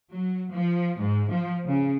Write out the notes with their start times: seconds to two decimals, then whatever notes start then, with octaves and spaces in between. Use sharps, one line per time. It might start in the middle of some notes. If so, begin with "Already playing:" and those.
0.12 F#3
0.53 F3
1.00 G#2
1.30 F3
1.66 C#3